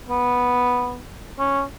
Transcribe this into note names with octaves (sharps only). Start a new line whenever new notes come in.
B3
C#4